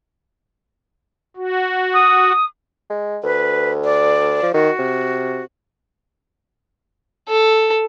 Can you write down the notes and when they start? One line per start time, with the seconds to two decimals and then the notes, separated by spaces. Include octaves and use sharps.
1.36 F#4
1.94 D#6
2.90 G#3
3.24 D2 B4
3.84 D5
4.43 F3
4.54 D#3 F#4
4.79 C3
7.28 A4